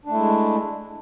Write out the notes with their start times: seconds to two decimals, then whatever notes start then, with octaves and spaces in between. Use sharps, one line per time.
0.05 D4
0.09 A3
0.13 E4
0.17 G#3